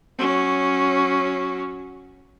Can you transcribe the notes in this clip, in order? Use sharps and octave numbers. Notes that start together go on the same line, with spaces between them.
F#3 C#4